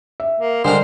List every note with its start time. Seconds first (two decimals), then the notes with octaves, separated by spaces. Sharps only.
0.20 E5
0.40 A#3
0.65 D3 G3 G#3 A#4 C5